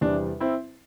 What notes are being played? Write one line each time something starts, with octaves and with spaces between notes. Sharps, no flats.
E2 C3 G3 D4
C4 E4